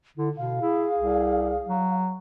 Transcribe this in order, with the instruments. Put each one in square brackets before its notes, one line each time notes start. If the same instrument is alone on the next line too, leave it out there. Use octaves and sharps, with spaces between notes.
[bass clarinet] D3 [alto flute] E4
[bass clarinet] B2 [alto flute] F5
[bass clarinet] E4 [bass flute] G#4
[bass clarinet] C2
F#3